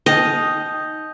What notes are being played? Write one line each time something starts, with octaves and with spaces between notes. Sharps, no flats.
D#4 D#5 G5 D#6 G6 A#6 F7